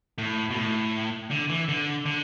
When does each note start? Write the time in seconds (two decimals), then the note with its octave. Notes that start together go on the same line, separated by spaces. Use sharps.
0.18 A2
0.51 B2
0.56 A2
1.31 D3
1.49 E3
1.68 D3
2.06 D3